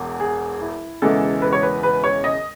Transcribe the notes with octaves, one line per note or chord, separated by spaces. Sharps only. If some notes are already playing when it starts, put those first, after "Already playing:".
Already playing: E1 E2
G#4
E4
E1 E2 C#3 E3 G#3 A4
B4
C#5
B4
B4
C#5
D#5